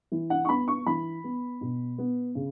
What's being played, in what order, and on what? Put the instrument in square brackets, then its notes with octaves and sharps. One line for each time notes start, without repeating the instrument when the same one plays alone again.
[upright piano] E3
F#5
C#6
B3 B5
C#6
E3 B5
B3
B2
B3
C#3